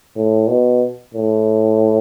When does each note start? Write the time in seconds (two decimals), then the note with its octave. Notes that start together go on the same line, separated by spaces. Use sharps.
0.16 A2
0.49 B2
1.14 A2